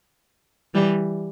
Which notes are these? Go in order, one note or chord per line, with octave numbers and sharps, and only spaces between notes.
E3 G3